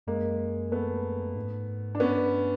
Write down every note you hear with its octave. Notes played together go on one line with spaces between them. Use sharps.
F#2 G#3 A#3
A3 B3
G#2
D4
G2 B3 C#4